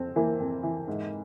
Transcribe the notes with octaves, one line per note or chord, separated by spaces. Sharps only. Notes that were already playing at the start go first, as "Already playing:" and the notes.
Already playing: F2 C4
E3 A#3
F2
E3
G#2